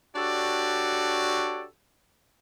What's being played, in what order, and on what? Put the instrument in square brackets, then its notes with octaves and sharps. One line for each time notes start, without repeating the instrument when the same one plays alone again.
[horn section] D4 F#4 G4 A4 C#5 D5